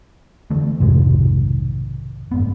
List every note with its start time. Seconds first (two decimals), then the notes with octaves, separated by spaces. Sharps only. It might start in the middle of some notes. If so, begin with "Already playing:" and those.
0.51 D3 E3 A3
0.80 B1 F2 G#2 C3 D#3 G#3
2.32 F#1 G#2 B3